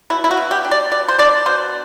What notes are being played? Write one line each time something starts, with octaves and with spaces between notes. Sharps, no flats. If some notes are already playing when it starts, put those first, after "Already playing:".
B2 E4
E4
F#4
B2
G4
D4
D5
B2 D5
C5
D4 D5
B2 C5